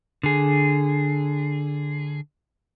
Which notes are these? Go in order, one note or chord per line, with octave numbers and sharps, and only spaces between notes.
D3 G#4